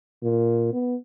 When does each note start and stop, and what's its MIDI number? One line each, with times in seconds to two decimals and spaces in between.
0.23 0.70 46
0.73 0.95 59